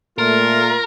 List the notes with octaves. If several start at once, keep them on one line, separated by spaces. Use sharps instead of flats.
A#2 A3 F4 A#4